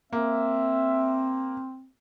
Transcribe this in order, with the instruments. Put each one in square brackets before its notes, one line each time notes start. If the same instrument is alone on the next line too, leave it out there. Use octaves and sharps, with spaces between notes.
[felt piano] A#3 [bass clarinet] C4 [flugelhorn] E5